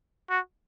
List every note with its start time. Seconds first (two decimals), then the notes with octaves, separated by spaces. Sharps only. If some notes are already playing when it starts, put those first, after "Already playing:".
0.30 F#4